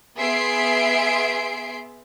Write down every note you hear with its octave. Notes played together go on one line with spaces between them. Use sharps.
B3 G#4 E5 C6 C7 D7